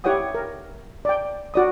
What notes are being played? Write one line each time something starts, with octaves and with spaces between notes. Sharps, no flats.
E4 G4 C#5 F#5 G5 D#6
A#4
D5 G5
F#4 D5 D#6